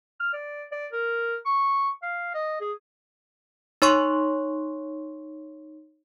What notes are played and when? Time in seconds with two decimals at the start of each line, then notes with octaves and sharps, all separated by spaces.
0.20 F6
0.33 D5
0.72 D5
0.92 A#4
1.46 C#6
2.03 F5
2.34 D#5
2.60 G#4
3.82 D#4 C#5 C6 C#6